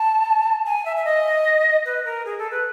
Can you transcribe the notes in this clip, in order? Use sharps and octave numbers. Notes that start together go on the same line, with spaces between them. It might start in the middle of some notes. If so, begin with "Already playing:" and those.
Already playing: A5
G#5
E5
E5
D#5
B4
A#4
G#4
A4
B4